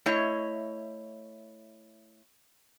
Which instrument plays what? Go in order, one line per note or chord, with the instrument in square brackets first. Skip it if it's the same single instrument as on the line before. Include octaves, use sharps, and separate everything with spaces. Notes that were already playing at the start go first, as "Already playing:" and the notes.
[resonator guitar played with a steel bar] A3 E4 C#5 D#5